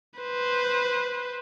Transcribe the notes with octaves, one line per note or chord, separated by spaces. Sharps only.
B4 C5